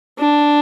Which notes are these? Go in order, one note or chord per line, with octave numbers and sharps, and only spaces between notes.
D4